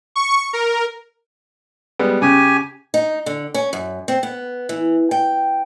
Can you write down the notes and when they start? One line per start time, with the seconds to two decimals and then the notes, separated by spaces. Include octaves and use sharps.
0.16 C#6
0.53 A#4
1.99 G3 G#3 B3
2.22 C#3 G4 G#5
2.94 D#4
3.26 D3
3.54 C#4
3.73 F#2
4.08 C4
4.23 B3
4.69 E3
5.11 G5